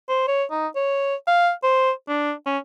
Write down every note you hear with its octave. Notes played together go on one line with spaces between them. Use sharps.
C5
C#5
D#4
C#5
F5
C5
D4
C#4